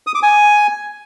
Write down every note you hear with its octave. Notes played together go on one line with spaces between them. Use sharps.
D#6
D6
G#5